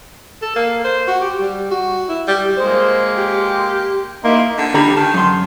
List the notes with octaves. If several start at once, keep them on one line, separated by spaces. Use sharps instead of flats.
A4
A#3
C5
F#4
G4
G3
F#4
E4
G3
G#3 A#3 C5
G4
A#3 D#4 E4 C6
D3
D3 G3 A#5 B5
D#3 A5
F#2 C6